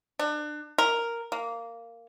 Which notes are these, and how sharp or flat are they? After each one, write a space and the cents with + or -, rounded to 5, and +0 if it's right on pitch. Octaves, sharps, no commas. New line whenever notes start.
D4 +30
A#4 +0
A#3 -10